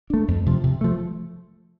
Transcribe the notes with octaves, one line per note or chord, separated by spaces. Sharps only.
A3 D4
F2
C3 F3
C3
F3 A3